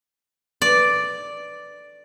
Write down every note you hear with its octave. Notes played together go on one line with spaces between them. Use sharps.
D5